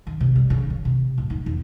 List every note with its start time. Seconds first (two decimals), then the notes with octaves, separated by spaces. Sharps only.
0.07 D#3
0.20 C3
0.36 G3
0.50 C#3
0.70 D#3
0.85 C3
1.18 D1
1.30 D#4
1.46 E2